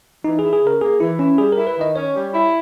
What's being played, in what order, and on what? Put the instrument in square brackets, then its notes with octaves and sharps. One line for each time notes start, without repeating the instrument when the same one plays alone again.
[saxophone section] E3 [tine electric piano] D#4
[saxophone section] E4 [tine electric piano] G#4
[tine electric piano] G#4
[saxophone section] C#3 [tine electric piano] A#4
[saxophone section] A#3 [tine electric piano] G#4
[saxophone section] E3 [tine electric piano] E4
[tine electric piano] C#4 [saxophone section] E4
[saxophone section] G3 [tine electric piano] G#4
[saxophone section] E4 [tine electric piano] A#4
[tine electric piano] B4
[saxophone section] D#3 [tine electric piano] D#5
[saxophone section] C#4 [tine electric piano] C#5
[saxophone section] G3
E4